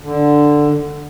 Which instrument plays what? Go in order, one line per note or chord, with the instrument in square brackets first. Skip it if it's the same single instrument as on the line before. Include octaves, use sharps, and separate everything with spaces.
[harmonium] D3